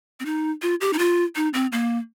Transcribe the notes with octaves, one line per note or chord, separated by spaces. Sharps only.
C4
D#4
F4
G4
D#4
F4
D#4
C4
A#3